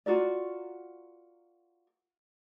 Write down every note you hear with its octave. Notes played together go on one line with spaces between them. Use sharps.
F4 F#4 A#4 D5